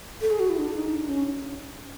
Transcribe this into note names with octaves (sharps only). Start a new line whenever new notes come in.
A4
G#4
F#4
E4
D4
D#4
D4
C#4